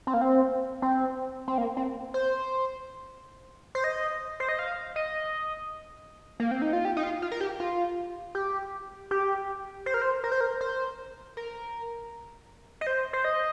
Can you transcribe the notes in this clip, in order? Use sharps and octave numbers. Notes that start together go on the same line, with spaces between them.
C4
A#3
C4
C4
C4
A#3
C4
C5
C5
D#5
C5
D#5
F5
D#5
A#3
C4
D#4
F4
G4
D#4
F4
F4
A#4
G4
F4
G4
G4
C5
A#4
C5
A#4
C5
A#4
C5
A#4
D#5
C5
C5
D#5